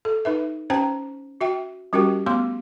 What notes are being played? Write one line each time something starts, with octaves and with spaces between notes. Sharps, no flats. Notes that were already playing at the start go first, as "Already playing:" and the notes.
A4
D#4 B4 E5
C#4 C5 G5 A#5
F#4 E5 G5
G3 C#4 F#4 G4 A#4 G5
A3 B3 C6 D6